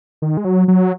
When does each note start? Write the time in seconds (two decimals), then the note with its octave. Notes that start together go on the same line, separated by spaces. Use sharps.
0.22 D#3
0.37 G#3
0.45 F#3
0.68 F#3